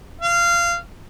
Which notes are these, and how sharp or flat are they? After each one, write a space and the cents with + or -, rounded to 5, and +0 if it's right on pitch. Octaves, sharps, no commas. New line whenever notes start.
F5 -20